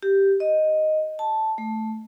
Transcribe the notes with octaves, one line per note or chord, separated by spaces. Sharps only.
G4
D#5
A5
A3